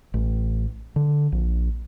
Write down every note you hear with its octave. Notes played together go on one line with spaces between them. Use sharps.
A1
D3
A#1